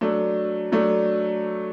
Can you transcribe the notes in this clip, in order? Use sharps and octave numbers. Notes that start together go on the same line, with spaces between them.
F#3 A3 D4
F#3 A3 D4